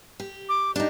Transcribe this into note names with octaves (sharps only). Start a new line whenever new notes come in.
G4
D6
D4 D#4 G4